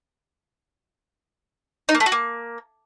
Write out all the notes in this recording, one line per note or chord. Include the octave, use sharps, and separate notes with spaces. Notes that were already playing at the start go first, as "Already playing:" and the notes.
D#4
A#3
A3
F#4
A#3